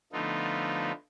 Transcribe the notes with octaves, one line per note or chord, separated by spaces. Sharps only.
D3 F3 A3 B3 D#4 F4